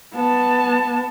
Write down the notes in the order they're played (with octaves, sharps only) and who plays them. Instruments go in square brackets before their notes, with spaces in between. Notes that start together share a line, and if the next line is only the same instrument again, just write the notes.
[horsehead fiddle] B3 A5